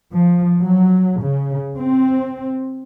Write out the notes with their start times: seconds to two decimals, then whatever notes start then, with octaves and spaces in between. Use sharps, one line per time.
0.12 F3
0.62 F#3
1.22 C#3
1.78 C4